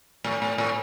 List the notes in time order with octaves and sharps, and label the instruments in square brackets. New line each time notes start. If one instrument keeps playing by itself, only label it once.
[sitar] A2
A2
A2